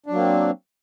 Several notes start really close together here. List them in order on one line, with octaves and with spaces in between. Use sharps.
D4 F#3 A#3 C4